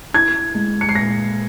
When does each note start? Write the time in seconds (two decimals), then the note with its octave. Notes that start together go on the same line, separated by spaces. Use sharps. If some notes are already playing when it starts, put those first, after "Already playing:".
0.14 E4 G#6
0.54 G#3
0.81 C#7
0.89 C7
0.95 A#2 A#6